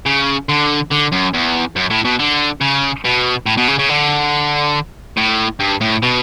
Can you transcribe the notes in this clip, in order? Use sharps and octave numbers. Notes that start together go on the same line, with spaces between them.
C#3
D3
D3
F#2
E2
F#2
A2
B2
D3
C#3
B2
A2
B2
C#3
C#3
D3
A2
G2
A2
B2